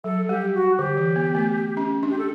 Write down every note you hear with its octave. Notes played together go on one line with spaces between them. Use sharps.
F#3 A4
G3 G4
F#4
D3 G4
E3
B3
A3
C#4
D4
G4
A4